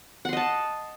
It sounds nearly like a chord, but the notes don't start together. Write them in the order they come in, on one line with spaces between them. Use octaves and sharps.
F#5 C6 D#5 A5